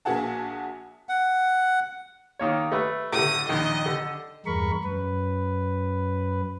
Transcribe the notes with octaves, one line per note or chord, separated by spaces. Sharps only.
A#1 A#3 F#4 G#4 F#5 A5
F#5
D#3 A#3 C#5
A3 B4
A2 D3 D#6
A#1 D#2 D#3 D#5
D3
E2 G2 G#3 A#4 B5 C#6
F#2 B4